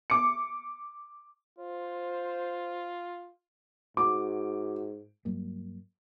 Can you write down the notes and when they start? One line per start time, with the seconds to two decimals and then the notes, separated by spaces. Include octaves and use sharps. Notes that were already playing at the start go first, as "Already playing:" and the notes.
0.10 D6 C#7
1.59 F4 C5
3.97 G#2 F#4 D6
5.25 G2 F#3 G3 A#3